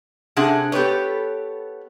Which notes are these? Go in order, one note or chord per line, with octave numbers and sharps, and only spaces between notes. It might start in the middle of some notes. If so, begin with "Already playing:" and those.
C3 D4 G#4 F#5
B3 G4 A4 B4 C#5